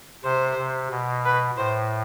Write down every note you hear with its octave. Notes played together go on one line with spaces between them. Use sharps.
C3 C5
C3
B2
B4
A2 C5